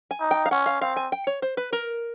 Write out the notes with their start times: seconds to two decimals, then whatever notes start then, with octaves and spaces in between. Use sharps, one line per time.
0.11 G#5
0.21 D#4
0.31 G5
0.46 F5
0.51 C#4 F#5
0.66 F5
0.81 C4 F5
0.96 G#5
1.12 G5
1.27 C#5
1.42 C5
1.57 B4
1.73 A#4